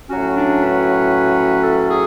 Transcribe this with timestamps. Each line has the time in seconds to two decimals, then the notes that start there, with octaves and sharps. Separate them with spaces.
0.10 A2 F#3 C#4 F#4
0.37 D4
0.61 B4
1.63 A4
1.89 G#4